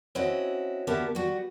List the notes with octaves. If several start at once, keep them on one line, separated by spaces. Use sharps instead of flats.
C4 C#4 E4 F#4 D#5
D2 B3 G4 A#4 E5 A5
G3 B3 F#4